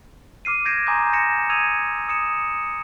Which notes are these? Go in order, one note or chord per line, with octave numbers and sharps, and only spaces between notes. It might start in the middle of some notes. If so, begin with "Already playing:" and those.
D6 F6 C7 D#7
G6 G#6 A#6 C7 D7 E7
G#5 A#5 C6 D6 D#6 G6
A#6 C#7 E7
D#6 E6 G#6 D#7 F7
D#6 C#7 E7